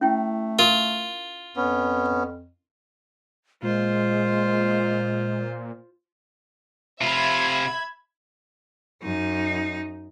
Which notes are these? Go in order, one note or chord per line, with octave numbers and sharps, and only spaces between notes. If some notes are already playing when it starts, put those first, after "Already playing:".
A3 C#4 E4 G5
F4 A#4
F2 B3 C#4
A#2 G#3 F4 C5
C3 F4 E5 B5 G#6
F#2 D#4